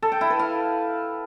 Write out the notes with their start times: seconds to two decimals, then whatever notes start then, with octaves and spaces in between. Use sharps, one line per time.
0.02 A4
0.12 G5
0.21 E4
0.30 B4
0.39 F5